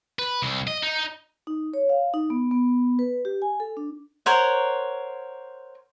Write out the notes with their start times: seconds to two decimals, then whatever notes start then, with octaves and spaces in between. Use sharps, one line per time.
0.19 B4
0.42 C2
0.67 D#5
0.83 D#4
1.47 D#4
1.74 C#5
1.89 F5
2.14 D#4
2.30 B3
2.51 B3
2.99 B4
3.25 G4
3.42 G#5
3.60 A4
3.77 D4
4.26 A#4 C5 C#5 F#5